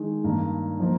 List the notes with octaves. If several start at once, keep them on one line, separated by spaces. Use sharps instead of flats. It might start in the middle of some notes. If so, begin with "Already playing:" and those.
Already playing: D#3 G#3
G2 D#3 A#3 D4
F3 A#3 D#4